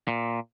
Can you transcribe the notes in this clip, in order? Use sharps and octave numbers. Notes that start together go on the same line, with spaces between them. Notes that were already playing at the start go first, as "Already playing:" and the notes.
A#2